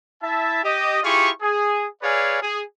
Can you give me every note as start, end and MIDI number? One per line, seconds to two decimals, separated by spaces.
0.22 0.61 64
0.22 0.61 76
0.22 0.61 81
0.63 0.99 67
0.63 0.99 75
1.03 1.29 64
1.03 1.29 65
1.03 1.29 67
1.03 1.29 68
1.03 1.29 85
1.41 1.87 68
2.02 2.39 68
2.02 2.39 71
2.02 2.39 73
2.02 2.39 74
2.02 2.39 77
2.02 2.39 80
2.41 2.61 68